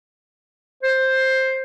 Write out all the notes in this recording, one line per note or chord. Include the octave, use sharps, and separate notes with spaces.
C5